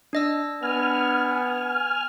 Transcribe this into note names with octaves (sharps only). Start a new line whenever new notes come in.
D4 D#5 E6
B3 G#5 F6